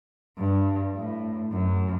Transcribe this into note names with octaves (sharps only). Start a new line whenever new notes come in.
G2
A2
F#2